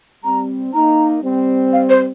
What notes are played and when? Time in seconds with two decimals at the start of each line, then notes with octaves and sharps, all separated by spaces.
0.24 G3 C4 A#5
0.74 A#3 D#4 A#5
1.23 G3 C4
1.73 F5
1.89 C5